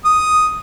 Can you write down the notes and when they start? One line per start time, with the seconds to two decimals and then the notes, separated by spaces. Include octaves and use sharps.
0.05 D#6